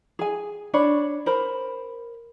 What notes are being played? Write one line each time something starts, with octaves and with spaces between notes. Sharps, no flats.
G#4 G#5
D4 C#5 B5
A#4 C5 B5